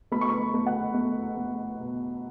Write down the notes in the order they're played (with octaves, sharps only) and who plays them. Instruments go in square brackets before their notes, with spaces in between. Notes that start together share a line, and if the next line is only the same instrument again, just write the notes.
[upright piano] A3 B5
C#6
B5
A3
F#5
A3
A3
B2